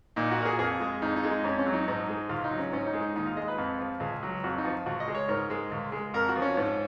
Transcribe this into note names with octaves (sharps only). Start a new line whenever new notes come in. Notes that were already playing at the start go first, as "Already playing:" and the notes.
A#2 D#4
F#4
A#2 A#4
G#4
F2 G#4
G#3
F2 D#4
D#4
G#3
D#4
F2 C#4
C#4
F#3
D#4
G#2 D#4
G#3
C#2 F4
D#4
F#3
C#4
G#2 C#4
D#4
G#3
D#4
D#2 D#4
F4
G#3 D#5
B4
F2
F3
C#2 G#4
F#3
F2 F#4
D#4
F3
C#2 F#4
D#5
G#3
C#5
G#2 A#4
G#3
C#2
G#3
F2 A#4
F#4
F3
C#4
G#2